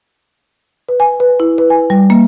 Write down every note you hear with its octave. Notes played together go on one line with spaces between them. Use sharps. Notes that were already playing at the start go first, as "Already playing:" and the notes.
B4
G#5
B4
E4
B4
G#5
G3
A#3